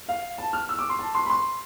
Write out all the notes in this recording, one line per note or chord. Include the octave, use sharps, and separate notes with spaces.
F5
A5
F6
E6
D6
C6
A5
C6
B5
C6